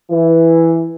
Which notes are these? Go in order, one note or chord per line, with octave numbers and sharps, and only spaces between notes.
E3